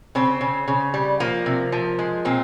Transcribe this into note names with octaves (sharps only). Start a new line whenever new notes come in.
C#3 C4
C#3
C#3
G3
F3 A#3
C3
F3
G#3
A#2 C4